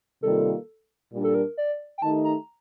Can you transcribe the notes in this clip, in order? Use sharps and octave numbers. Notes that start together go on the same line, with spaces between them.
C3 D#3 G3 A#3 F4 A4
A#2 G3 D4
A4
A#4
D5
G5
D#3 A3 D#4 G4 A5
A#5